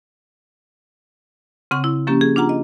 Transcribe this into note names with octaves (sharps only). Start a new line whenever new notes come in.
C#3 C4 F#5 C#6
E4
F3 A#3 C#4 G4
G#4
D4 F4 F#5 A#5
D#5